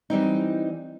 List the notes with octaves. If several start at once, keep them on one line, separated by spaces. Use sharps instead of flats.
E3 G3 C4 D#4